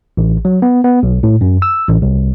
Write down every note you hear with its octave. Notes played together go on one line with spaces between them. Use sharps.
A1
F#3
B3
B3
B1
A2
F#2
E6
A1
C2